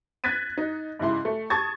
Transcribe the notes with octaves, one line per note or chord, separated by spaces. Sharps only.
F#6 G#6 A6 B6 D#7
D#4
G#2 C#3 E4 C6
A3
A5 C#6 D#6 G#6 A6